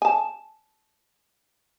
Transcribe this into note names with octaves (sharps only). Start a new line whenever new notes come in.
G#5 A5